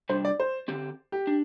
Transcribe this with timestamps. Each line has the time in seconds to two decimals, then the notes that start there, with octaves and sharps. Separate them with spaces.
0.09 C3 G3 D4 C5
0.25 D5
0.40 C5
0.68 D3 C4 G4
1.12 G4
1.27 D4